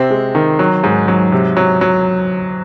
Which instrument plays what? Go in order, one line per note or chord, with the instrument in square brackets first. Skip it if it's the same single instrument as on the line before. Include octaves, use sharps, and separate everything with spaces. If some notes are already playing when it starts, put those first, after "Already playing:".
Already playing: [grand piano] C3 C4
G#3
D#3
F#3
G#2
F#3
C3
F#3
F#3